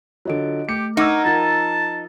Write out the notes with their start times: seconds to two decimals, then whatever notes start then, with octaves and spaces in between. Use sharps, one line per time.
0.25 D3 F#3 F4 D#5 D7
0.69 A3 G4 C#7
0.97 D#4 A#4 F#5 C#6 D6 E6 G#6
1.25 F3 A#4 A5 A#5 A6